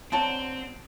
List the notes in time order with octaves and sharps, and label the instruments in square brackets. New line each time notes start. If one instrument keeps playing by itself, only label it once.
[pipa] D3 F#3 A5 [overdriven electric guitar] C4